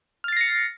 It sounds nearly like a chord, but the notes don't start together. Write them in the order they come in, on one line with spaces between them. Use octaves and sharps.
F6 A6 C7 A#6 C#7